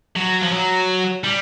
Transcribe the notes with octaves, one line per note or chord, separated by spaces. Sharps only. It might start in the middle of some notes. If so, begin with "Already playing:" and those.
F#3
F3
F#3
G3